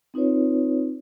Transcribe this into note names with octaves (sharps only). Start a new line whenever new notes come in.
C4 D#4 F4 B4 C#5